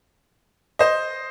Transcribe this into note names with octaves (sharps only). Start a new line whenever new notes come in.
C5 D#5